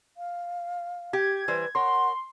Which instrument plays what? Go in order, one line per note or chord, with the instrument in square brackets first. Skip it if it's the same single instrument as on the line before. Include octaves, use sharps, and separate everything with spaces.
[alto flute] F5
[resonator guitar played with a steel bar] G4 [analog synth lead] G#6
[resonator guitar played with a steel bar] E3 G3 C5 [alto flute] B4
[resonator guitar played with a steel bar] A#4 C#5 [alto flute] F#5 [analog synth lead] C6